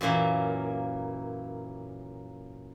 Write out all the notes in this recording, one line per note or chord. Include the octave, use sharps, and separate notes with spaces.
F#2 A#2 E3 A#3